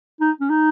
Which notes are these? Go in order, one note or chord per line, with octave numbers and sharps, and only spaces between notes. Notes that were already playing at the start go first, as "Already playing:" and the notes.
D#4
C#4
D#4